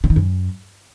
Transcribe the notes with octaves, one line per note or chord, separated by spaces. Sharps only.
D3
D#3
F#2